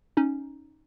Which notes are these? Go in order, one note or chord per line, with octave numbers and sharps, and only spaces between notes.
C#4 D#4